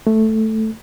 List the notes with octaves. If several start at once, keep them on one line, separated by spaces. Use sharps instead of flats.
A3